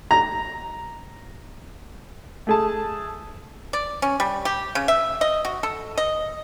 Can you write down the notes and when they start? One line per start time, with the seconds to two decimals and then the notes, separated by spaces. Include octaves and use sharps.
0.11 A#5
2.47 A3 G#4 A5
3.73 D5
4.02 C#4
4.20 G3
4.45 G4
4.75 C#3
4.88 E5
5.21 D#5
5.45 F#4
5.63 A4
5.97 D#5